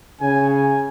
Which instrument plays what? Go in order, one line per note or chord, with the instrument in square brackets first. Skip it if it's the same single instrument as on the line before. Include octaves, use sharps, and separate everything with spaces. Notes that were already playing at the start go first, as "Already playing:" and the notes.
[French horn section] C#3 [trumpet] G#5
[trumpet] G#5